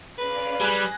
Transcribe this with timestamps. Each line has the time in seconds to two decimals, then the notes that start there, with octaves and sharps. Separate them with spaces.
0.18 C#4 B4 D5 F5
0.60 G3 G#4 F#6 A#6